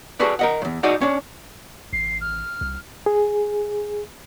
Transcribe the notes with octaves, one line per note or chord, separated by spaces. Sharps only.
F#4 G#4 A4 B4 D5
A#4 D#5 F#5
E2 G2
D#4 F#4 G#4 D5 D#5
C#4 D4
A1 C7
F6
C2
G#4